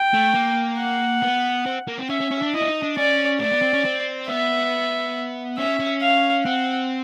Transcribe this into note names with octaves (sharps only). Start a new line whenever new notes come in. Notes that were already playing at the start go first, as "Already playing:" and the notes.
Already playing: G5
A3
A#3
F#5
B3
C4
A#3
C4
C#4 E5
C#4
C#4
D4
E4 D#5
D4
D#4
D4
C#4 D5
A3 D5
B3
C4
C#4
C4
B3 E5
C#4 E5
C#4
F5
C4 F#5